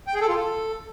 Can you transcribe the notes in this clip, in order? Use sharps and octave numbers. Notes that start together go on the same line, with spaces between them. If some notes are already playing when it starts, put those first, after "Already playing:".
G5
G#4
A4
F4
A4